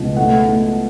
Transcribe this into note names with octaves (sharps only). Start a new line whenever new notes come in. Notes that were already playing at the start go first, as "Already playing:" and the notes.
Already playing: C#2 B2
A3 F#5
A3